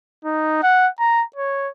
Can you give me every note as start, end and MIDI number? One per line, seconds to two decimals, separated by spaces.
0.25 0.58 63
0.63 0.89 78
1.00 1.24 82
1.36 1.69 73